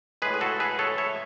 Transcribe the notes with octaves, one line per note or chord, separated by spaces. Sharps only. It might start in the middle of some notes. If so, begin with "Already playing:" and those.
A2 G#3 G#4 B4
G#4
F#4 A4
G#4 B4
A4 C#5
C#5 E5